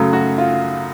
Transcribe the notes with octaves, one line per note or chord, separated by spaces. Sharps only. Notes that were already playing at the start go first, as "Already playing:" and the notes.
Already playing: F#2 C#3 F#3 A3
F#4
F4